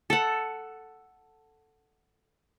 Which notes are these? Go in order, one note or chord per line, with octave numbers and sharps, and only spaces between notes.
A4 F#5